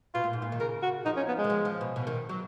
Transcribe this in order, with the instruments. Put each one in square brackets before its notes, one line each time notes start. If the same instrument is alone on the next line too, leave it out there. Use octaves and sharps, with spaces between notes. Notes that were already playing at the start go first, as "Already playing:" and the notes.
[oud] B2 [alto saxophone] F4
[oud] A#2
G#2
A#2
D#3
[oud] C#3 [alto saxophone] A#4
[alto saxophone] F#4
[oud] F3 [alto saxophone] D#4
[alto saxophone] C#4
B3
G#3
[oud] D#3
F3
F3
B2
B2
D#3
F#3